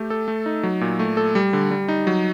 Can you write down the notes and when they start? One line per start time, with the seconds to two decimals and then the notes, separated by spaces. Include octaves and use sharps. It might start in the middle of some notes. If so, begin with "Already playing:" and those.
Already playing: A3 G4
0.10 A4
0.28 A3
0.46 D#4
0.63 F#3
0.81 A#2
0.99 A3
1.17 A4
1.35 G3
1.53 D3
1.71 G3
1.88 D#4
2.07 F#3